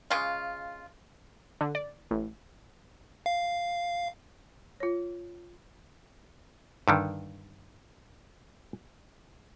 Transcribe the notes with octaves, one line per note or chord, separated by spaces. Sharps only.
C#3 G#3 F4
D3
D5
A1
F5
F4 C#5
G2 D3 D#3